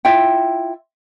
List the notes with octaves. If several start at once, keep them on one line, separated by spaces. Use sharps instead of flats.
E4 F4 E5 G5